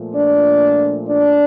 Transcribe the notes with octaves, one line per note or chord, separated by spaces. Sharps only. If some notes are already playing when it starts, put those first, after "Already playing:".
Already playing: A#2 F3 A3
D4 D5
D4 D5